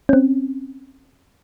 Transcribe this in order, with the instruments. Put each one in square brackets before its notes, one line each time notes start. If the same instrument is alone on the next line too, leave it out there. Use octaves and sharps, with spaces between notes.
[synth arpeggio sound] C4 C#4